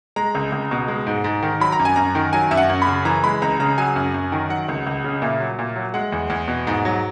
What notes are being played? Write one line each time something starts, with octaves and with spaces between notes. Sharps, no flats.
G#3 A#5
C#2
C#2
B2
G#3
G#2
G#2
D#3
F#3 B5
A#5
F#2
G#5
F#2 A#5
D#3
F#3 G#5
F#2 E5
F#5
F#2
C#3 B5
E3 A#5
G#3 B5
C#2 A#5
C#3 A#5
F#3 G#5
F#2
F#2
D#3
F#3 F#5
C#2
C#2
C#3
A#2 E5
F#3
A#2
F#3
G#3 F#5
E2
E2
B2
G#2
F#3